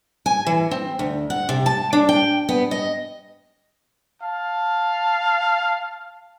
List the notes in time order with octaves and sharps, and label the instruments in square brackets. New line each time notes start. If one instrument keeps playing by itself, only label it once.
[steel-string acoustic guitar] G#5
E3
C4
D2
F#5
C3
A5
D4
G5
B3
D#5
[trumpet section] F5 A5